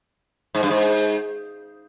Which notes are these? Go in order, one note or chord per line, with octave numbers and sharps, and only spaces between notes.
G#2
G2
G#2